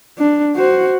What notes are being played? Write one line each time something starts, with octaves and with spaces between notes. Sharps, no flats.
D4
F#4 C5